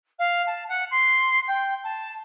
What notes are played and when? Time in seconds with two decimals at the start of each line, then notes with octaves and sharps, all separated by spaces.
0.19 F5
0.46 A5
0.69 F#5
0.90 C6
1.47 G5
1.83 A5